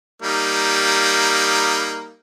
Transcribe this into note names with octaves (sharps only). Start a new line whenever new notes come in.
G3 A#3 D#4